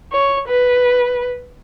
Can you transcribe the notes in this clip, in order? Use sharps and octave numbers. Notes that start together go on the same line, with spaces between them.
C#5
B4